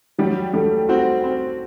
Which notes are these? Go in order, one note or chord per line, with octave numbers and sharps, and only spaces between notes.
F#3 G3
G3 A3
C4 F#4
C4